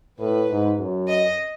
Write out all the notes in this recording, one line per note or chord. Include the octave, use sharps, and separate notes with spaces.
A2 B4
G#2
F#2
D#5